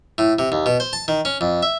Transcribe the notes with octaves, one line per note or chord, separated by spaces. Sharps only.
A2
C3
D#2
B2
C5
A5
D#3
C#4
F2
E5